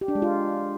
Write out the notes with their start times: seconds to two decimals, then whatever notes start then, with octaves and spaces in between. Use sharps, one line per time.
0.01 G4
0.08 D4
0.15 G#3
0.22 F4